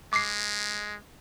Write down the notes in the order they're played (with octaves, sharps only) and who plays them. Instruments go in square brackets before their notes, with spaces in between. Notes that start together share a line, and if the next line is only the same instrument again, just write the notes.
[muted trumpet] G#3 [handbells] D6 C7